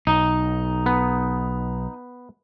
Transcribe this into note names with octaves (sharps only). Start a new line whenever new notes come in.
B1 D#4
B3